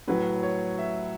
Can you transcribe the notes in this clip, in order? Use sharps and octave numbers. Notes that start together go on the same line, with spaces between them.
A2 F#3 B4
C#5
E5